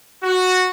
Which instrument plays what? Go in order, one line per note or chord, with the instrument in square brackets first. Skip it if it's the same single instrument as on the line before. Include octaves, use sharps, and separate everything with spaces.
[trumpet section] F#4